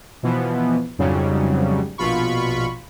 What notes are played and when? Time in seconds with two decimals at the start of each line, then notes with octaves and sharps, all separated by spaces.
0.23 B2 E3 F3 B3
0.98 F2 G#2 C#3 F#3 G3
1.98 A#1 B2 F4 B5 C#6